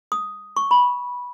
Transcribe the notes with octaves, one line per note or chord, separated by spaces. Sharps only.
D#6
C#6
B5